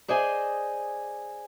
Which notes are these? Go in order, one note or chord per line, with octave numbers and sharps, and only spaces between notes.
G#4 C5 D5 D#5 G#5